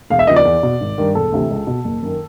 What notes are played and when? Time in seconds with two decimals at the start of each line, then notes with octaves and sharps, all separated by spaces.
0.10 E1 F5
0.19 E5
0.27 D#2 C#3 F3 D#5
0.36 D5
0.45 E2
0.63 B2
0.81 G#1
0.98 G2 D#3
1.15 E1 A4
1.32 D2 C3 E3
1.50 C#2
1.67 B2
1.85 F#1
2.02 F#2 D#3